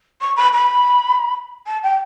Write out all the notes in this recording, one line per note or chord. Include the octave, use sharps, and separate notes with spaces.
C#6
B5
B5
A5
G5